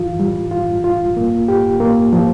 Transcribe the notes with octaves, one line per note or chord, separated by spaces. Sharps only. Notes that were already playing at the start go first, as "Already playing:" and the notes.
Already playing: E3 F4
G3
F4
F4
A#3
G4
A#3
F3